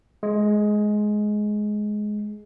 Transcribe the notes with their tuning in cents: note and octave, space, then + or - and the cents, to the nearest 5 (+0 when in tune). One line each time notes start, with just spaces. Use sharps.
G#3 +15